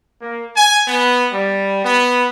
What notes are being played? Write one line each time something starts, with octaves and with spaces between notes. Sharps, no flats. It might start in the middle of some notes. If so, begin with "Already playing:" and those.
A#3
G#5
B3
G3
B3